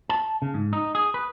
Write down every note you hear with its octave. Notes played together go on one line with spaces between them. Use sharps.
A5
C#3
G#2
D#4
G#4
B4